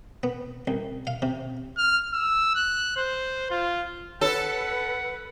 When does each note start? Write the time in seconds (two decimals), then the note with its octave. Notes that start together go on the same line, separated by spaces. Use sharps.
0.23 B3
0.68 C2
1.07 F5
1.22 C3
1.77 F6
2.13 E6
2.55 F#6
2.97 C5
3.51 F4
4.21 A4 B4 C#5 F#5